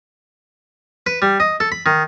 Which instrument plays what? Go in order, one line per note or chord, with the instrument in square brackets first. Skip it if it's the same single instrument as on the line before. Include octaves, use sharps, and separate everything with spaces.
[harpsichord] B4
G3
D#5
A4
B5
D#3